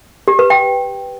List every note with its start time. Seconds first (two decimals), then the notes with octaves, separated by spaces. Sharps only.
0.28 G4
0.39 B4
0.50 G5